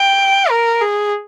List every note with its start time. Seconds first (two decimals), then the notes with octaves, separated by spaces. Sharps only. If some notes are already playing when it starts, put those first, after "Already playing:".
Already playing: G5
0.50 A#4
0.81 G#4